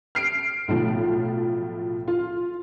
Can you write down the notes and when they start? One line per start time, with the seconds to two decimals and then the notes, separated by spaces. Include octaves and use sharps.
0.15 F6 C7 D7
0.68 B1 A2 F3
2.08 F4